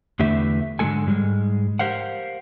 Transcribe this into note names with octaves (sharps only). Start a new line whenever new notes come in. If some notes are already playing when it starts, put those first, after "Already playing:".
E2 D3 A3 G4 B4 E5
G#2 D3 F#3 G#3 A4 G#5
G#2 G3 G#3
G4 A#4 C5 F5 F#5